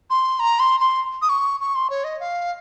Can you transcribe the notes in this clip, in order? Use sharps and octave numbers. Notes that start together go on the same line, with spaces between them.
C6
A#5
C6
C6
D#6
C#6
C#6
C6
C#5
D#5
F5